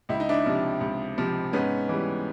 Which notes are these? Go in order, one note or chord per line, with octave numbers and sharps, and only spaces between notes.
C#2 E4
D#4
D4 E4
C3 F3
C#2
C3 F3
G#2 B3 C#4
E3 G3